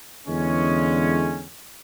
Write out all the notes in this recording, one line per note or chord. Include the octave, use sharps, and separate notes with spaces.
E2 D3 G#3 C#4